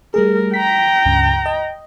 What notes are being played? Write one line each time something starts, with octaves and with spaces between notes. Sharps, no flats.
G3 A3 G#4 A#4
G5 A#5 B6
C#2 G2 C#3
D#5